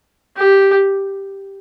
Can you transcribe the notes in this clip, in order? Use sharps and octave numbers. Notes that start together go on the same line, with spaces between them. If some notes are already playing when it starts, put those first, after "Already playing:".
G4